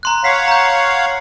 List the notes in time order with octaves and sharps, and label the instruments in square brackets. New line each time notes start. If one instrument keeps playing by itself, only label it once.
[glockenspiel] A#5 C6 F#6
[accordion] C#5 F5 F#5 [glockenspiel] B6 C7
[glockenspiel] A#5 G6